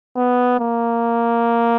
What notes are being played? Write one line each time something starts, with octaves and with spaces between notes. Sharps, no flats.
B3
A#3